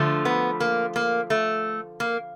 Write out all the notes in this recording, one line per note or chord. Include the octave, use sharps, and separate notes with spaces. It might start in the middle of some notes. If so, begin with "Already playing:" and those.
Already playing: D3 F3 A3
B3
A#3
A#3
A3
A#3